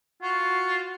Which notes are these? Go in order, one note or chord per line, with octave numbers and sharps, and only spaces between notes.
F4 F#4